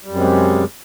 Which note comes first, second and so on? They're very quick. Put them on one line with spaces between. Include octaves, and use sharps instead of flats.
G3 F#2 C3 G#3